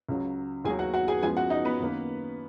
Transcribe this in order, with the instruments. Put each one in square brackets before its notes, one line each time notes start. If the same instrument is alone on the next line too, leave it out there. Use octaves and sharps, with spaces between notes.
[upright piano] C#2 C#3 F#3
D#2 D#3 F#3 G#4 G#5
F#4 F#5
F#4 F#5
G#4 G#5
F#2 F3 G#3 B3 G#4 G#5
F#4 F#5
D#4 D#5
B3 B4
F#2 D#3 A#3